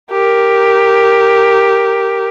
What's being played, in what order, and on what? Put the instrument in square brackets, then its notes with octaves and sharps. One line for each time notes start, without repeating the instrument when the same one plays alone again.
[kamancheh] G4 A#4